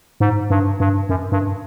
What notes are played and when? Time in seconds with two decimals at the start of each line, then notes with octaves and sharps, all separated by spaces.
0.20 G#2
0.50 G2
0.80 G2
1.09 F#2
1.32 G2